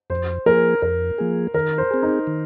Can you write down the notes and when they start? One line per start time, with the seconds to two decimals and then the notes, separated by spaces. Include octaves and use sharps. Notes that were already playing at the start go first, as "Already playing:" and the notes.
0.10 F2 C5
0.46 F3 A#3 G#4 A#4
0.82 F2 A#4
1.18 F3 A#3 G#4
1.54 D#3 A#4
1.78 C5
1.91 C4 G#4
2.03 D#4
2.27 D#3